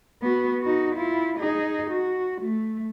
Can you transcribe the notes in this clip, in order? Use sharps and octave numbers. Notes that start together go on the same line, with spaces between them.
B3 F#4
D#4 F#4
E4 F4
D#4 G#4
F#4
A3